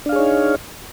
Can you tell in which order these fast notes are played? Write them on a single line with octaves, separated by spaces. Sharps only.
D4 F5 G#4 C#5 D#4